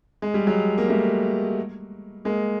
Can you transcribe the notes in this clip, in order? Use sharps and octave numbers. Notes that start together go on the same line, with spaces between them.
G#3
G3
F#3 G#3
A#3
G3 A3
G#3 A#3